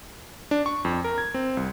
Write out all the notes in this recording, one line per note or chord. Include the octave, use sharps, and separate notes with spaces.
D4
C#6
F2
A#4
G#6
C4
C2